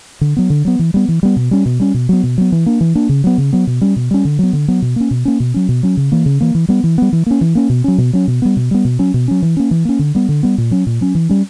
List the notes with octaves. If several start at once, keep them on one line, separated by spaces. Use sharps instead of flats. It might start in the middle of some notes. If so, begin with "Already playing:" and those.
D3
F#3 B3
D3
F#3 B3
E3
G3 B3
E3
G3 B3
B2
G3 C#4
B2
G3 C#4
B2
F#3 B3
B2
F#3 B3
E3
A#3 D4
E3
A#3 D4
C#3
F#3 B3
C#3
F#3 B3
B2
G3 C#4
B2
G3 C#4
D3
F#3 B3
D3
F#3 B3
B2
A#3 C#4
B2
A#3 C#4
B2
F#3 C#4
B2
F#3 C#4
C#3
E3 A#3
C#3
E3 A#3
E3
G3 B3
E3
G3 B3
E3
A#3 C#4
E3
A#3 C#4
B2
F#3 C#4
B2
F#3 C#4
B2
G3 B3
B2
G3 B3
B2
F#3 C#4
B2
F#3 C#4
E3
A#3 C#4
E3
A#3 C#4
D3
G3 B3
D3
G3 B3
A#2
F#3 C#4
A#2
F#3 C#4
E3
G3 C#4